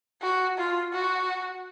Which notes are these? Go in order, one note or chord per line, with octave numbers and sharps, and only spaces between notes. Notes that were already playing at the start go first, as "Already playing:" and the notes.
F#4
F4
F#4